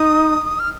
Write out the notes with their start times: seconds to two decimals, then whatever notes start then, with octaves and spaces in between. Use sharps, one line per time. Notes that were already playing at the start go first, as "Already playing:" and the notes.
Already playing: D#4 D#6
0.59 F6